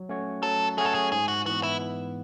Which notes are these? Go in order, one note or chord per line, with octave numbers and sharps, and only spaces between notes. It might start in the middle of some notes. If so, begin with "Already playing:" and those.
Already playing: F#3
A3 C#4 F#4 C#5
F#3 A4
A3 C#4 F#4 G#4 C#5
A4
G#4
G#2 G#4
F#4
E3 B3 F#4
E4